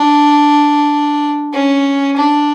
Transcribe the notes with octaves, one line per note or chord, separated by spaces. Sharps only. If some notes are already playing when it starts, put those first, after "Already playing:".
Already playing: D4
C#4
D4